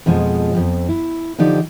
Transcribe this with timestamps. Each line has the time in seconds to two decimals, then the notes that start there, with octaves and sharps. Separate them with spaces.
0.06 F2 B2 F3 G#3
0.53 F2 G#2 F3
0.89 E4
1.39 D3 F3 D#4 G4 D5